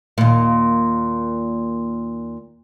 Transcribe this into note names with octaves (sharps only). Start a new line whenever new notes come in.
D#2 A#2